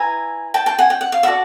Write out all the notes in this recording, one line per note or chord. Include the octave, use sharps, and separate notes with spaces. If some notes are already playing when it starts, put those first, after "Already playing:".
Already playing: E4 B4 G#5 A#5
G5 A5
G5 A5
F#5 G#5
G5
F#5
F5
D#4 F#4 A4 D5 E5 F#5